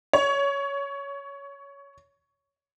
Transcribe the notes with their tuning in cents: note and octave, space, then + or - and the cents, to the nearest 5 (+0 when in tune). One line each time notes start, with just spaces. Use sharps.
C#5 +15